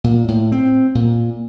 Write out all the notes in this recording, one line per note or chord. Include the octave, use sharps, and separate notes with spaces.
A#2
A2
C4
A#2